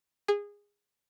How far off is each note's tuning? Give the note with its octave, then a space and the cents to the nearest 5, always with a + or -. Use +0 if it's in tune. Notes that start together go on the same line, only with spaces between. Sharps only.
G#4 -20